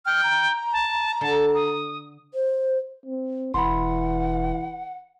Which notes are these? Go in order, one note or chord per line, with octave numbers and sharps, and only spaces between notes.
G5 F6
A#5
A5
D3 A5
D#6
C5
C4
E1 E3 F#5 B5 C6